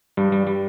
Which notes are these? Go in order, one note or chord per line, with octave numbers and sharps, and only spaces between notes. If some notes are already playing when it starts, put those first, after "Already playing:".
G2 G3
G3
G3